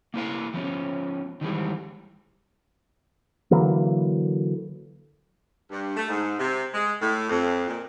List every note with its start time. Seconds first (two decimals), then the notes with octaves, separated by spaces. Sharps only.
0.14 A#3 E4 B4 F5
0.54 F3 B3 C#4
1.41 D#3 E3 G3 G#3
3.51 D3 E3 F#3 A#3
5.70 G2
5.97 A3
6.09 G#2
6.38 C3
6.74 G#3
7.01 A2
7.29 F2
7.68 A#2